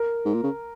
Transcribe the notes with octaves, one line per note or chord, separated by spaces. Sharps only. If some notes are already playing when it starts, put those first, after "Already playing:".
Already playing: A#4
G#2
A#2
C#3